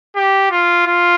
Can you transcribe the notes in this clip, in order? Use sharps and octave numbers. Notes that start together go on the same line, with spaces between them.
G4
F4
F4